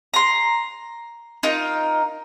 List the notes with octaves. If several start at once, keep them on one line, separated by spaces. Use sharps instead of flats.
A#5 C6
D#4 F4 A#4